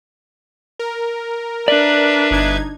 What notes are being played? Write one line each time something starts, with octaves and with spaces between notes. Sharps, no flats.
A#4
D4 B4 D5 E5
G1 D#4 G#6